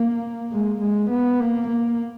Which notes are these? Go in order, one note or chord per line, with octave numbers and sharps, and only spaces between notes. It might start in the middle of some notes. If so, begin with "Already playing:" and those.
Already playing: A#3
G#3
G#3
B3
A#3
A#3